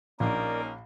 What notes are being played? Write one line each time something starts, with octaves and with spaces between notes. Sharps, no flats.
A#1 A#3 C#4 D#4 A#4 D5